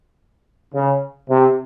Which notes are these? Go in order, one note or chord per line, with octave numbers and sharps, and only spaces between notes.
C#3
C3